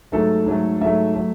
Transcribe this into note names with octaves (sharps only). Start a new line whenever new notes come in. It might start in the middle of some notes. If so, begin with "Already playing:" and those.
G#2 F#3 A3 A4
G#2 F#3 A3
G#2 F#3 A3 E5
F#3 A3